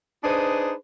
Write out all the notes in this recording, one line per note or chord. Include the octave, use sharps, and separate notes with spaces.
D4 D#4 G#4 B4 C5